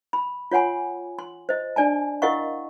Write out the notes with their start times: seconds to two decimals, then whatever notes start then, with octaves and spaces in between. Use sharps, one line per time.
0.13 B5
0.51 F4 C#5 F#5 G#5 C6
1.19 C6
1.49 C5 D#5
1.76 D4 D5 G#5 A5
2.22 E4 A#4 D#5 F5 F#5 C#6